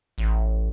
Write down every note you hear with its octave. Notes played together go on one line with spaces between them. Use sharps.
A1